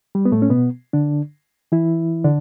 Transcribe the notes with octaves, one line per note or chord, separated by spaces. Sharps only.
G3
B3
A2 A3
C#4
B2 B3
D3 D4
E3 E4
D3 D4